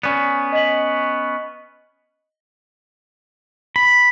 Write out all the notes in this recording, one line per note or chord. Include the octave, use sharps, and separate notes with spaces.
B3 C#4 D5 B6
D#5 B6 F#7
B5